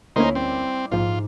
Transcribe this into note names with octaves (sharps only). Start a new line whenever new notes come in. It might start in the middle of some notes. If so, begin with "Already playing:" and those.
D2 A#3 C#4 D#4 E4 A#4 C5
G3 C4 D6
A#1 G#2 F3 F4